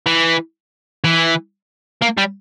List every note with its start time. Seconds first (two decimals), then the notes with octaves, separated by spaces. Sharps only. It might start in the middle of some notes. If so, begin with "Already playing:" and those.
0.06 E3
1.04 E3
2.02 A#3
2.17 G3